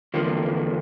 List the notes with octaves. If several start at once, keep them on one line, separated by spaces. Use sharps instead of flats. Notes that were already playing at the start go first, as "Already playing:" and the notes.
E2 D3 F3 A#3